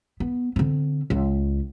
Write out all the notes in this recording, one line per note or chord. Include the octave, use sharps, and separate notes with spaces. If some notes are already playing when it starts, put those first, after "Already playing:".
B3
D3 C4
C#2